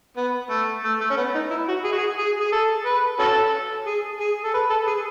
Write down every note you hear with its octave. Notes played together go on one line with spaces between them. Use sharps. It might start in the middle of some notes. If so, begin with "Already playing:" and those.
B3
A3
A3
A3
C#4
B3
D#4
E4
F#4
G#4
F#4
G#4
G#4
G#4
A4
B4
C#4 F#4 A4
G#4
G#4
A4
B4
A4
G#4